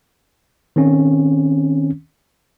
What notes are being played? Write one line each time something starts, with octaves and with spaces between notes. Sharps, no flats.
D#3 C4 C#4